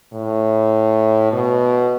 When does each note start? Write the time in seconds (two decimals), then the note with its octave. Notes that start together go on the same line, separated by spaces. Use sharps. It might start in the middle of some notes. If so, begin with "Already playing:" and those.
0.13 A2
1.32 B2